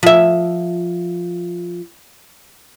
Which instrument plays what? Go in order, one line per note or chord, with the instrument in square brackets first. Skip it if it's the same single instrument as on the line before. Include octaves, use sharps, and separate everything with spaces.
[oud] F3 E5